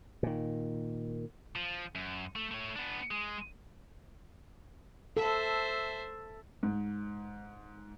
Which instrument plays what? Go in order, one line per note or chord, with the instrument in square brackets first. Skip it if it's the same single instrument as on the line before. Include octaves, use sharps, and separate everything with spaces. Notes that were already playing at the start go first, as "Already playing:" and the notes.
[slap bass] A#2 D#3
[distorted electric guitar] F3
F#2
A3
A3 C#5
B3 D4
G#3
[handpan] A4 [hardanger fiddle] C5 E5
[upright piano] G#2